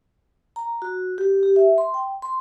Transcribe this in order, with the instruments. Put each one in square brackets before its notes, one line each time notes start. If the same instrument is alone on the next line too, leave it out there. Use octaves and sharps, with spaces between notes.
[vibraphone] A#5
F#4
G4
G4
E5
C6
G5
C6